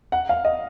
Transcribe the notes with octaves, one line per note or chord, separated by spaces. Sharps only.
F#5
F5
D#5